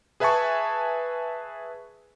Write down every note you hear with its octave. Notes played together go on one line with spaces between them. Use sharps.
G#4 B4 E5 G#5 A5 C#6